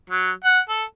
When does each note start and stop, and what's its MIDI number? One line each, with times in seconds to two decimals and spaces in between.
0.10 0.31 54
0.45 0.60 78
0.69 0.84 69